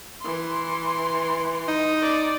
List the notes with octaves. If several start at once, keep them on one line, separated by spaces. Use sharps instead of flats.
E3 C6
D#4
D5